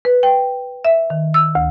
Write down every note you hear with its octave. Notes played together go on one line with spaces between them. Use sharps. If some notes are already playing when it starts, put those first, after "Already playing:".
B4
G5
E5
D#3
E6
D2